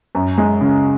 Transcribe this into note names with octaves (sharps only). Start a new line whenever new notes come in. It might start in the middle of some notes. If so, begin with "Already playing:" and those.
F#2
G#3
C#3